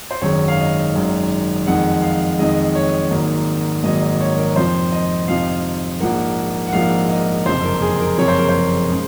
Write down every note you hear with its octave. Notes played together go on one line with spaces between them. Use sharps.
C5
G#1 F#2 D#3 G#3 C#5
F5
D#5
G#1 F#2 D#3 G#3
F2 D#3 G#3 F#5
F5
F2 D#3 G#3 D#5
C#5
G#1 G#2 F#3 A#3
G#1 G#2 F#3 A#3 D#5
D#5
C#5
A#4
F2 C3 F3 C5
D#5
F2 C3 F3 F5
A#1 G#2 F3 A#3 F#5
F#5
A#1 G#2 F3 A#3 F5
D#5
F#1 F2 C3 C5
A#4
G#4
A#4
F#1 F2 C3 C#5
C5
A#4
C5
C#3 G#3